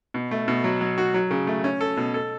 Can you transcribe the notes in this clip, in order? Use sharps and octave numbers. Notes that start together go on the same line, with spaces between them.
B2
A3
B2
F#3
F#3
F#4
F#3
C#3
A3
C#4
A4
B2
A4